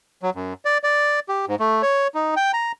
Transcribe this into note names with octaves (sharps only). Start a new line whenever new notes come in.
F#3
F#2
D5
D5
G4
G#2
A3
C#5
D#4
G5
A#5